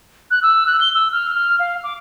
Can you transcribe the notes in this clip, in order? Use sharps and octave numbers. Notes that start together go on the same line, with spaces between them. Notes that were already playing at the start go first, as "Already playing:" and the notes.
F#6
E6
F#6
G7
E6
F6
F6
F5
D6